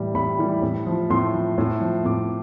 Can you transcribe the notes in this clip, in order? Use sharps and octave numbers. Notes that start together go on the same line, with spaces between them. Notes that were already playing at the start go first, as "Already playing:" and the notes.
Already playing: A2 E3 G3
A2 B5
E3 G3
A2
F3
A2 C6
F3
A2
F3
A2 D6